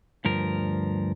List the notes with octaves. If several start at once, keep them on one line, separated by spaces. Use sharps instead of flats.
D2 G2 F3 A#4